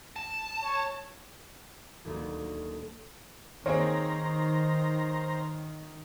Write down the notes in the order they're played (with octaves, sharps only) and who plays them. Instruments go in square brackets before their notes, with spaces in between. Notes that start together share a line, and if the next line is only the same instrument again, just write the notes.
[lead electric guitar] A5
[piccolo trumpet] C#5
[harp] D#1 D2 F#3 A#3 D5
[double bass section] D#3 [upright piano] A#3 C4 G#4 [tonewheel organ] C5 A#5 [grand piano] C#5